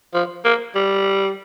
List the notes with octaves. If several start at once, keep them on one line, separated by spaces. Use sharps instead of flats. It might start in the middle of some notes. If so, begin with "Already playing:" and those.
F3
A#3
G3